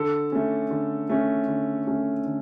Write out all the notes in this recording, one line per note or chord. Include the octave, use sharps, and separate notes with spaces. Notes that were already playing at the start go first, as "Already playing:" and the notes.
Already playing: D3 A4
A3 C#4
D3
A3 C#4
D3
A3 C#4
D3